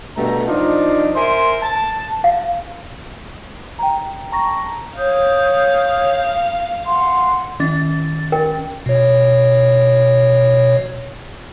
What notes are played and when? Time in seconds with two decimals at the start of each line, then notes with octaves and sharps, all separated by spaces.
0.16 G2 B2 A3 G4 A#5
0.47 F3 D4 D#4 F4
1.15 A#4 C5 E5 G#5 C6
1.62 A5
2.24 F5
3.79 G5 A#5
4.32 A5 A#5 C#6 A#6
4.97 C#5 F5 D#6 G6
6.86 F#5 C6
7.60 D#3 C#4 A6
8.32 A#4 G5
8.86 B2 C#5